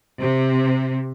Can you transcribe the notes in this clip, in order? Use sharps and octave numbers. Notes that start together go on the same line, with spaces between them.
C3